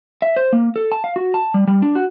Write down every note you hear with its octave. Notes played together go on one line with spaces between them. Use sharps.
E5
C5
A#3
A4
A5
F5
F#4
A5
G3
G3
D4
F#4